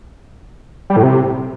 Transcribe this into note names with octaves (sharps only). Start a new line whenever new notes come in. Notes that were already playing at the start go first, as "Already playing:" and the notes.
G3
A2
C3